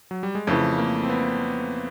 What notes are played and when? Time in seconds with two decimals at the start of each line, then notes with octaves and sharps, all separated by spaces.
0.11 F#3
0.23 G3
0.35 G#3
0.47 F2 C#3 E3 A3
0.78 A#3
1.03 C4
1.09 B3